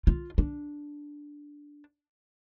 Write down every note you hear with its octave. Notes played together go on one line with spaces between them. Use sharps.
F4
D4